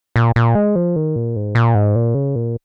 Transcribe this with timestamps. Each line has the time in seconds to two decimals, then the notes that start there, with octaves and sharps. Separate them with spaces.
0.16 A#2
0.36 A#2
0.55 G#3
0.76 F3
0.96 D#3
1.16 A#2
1.36 G#2
1.55 A#2
1.75 G#2
1.95 A#2
2.15 C#3
2.36 A#2